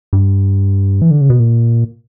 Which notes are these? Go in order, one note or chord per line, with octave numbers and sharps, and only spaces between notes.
G2
E3
D3
C#3
B2
A#2